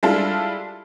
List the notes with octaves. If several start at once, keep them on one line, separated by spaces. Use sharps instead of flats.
G3 G#3 D4 E4 F4 A4